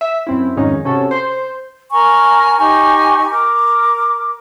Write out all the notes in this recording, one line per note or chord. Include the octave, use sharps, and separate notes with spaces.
E5
F#2 C4 E4
F2 G#2 D#3 C#4 D#4
C3 C#4 F#4 A4
C5
A#4 G#5 A#5 C#6
D#4 G4 G#5 C#6
A#4 D6